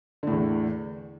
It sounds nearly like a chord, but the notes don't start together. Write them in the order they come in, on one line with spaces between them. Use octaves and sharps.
D3 A2 E2